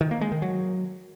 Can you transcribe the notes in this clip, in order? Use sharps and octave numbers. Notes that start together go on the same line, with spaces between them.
D#3
A#3
G#3
D#3
F#3